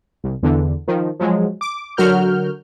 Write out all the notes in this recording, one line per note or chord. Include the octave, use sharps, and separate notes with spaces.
C2
E2 D3
D#3 F3
F3 F#3 G#3
D6
D3 F#3 F#4 A#4 F6 G6